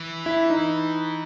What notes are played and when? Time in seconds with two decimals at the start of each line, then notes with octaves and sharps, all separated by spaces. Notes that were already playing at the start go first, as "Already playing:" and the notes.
Already playing: E3
0.26 E4
0.50 D#4